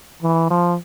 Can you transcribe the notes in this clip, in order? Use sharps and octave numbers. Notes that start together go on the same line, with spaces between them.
E3
F3